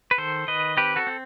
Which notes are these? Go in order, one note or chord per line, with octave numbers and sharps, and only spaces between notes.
B4
D#3 A4 C5
D#3 B4 D#5
C4 G4 B4
F#4 A4
C4